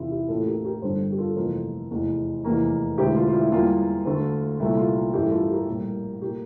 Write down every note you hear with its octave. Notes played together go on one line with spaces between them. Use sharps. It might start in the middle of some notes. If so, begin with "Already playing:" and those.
Already playing: E2 C3 E3 E4 F4
E4 G4
A1 A2 E3 A#3 F4 A4
G4 A#4
G4 A#4
G1 G2 D3 A4 C5
G4
F4 A4
F1 F2 E3 A#3 F4 A4
F1 E2 E3
F1 E2 E3 A#3
E1 D2 D3 E4 G4
F4
F4
E4
E2 E3 G3 A#3 F4
D2 D3 A3
C2 A#2 A3 E4
F4
F4
A1 G2 E3 A3 E4 G4
F4 A4
G4 A#4
A#1 A2 G3 A#3
A#2 A3 G4 A#4